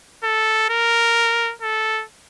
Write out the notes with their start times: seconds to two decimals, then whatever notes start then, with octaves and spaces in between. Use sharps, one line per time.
0.24 A4
0.70 A#4
1.62 A4